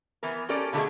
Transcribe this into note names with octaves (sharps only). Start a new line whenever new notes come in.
E3 B3 A#4
C#4 G4 A4 A#4 D5
B2 D3 A3 E4 G#4 D#5